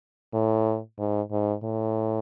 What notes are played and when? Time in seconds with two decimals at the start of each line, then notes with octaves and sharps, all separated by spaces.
0.34 A2
0.99 G#2
1.31 G#2
1.64 A2